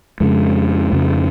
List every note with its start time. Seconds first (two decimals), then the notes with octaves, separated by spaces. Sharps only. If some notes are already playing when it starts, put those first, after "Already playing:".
0.20 F2 C#3 G#3
0.92 F2 C#3